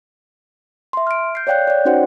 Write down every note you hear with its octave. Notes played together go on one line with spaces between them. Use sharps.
E5 C6
F6 D7
G6 C7
C#5 D5 F5 G5 F#6 G6
C#5 D5
C#4 D#4 F#4 C5 F#5 G5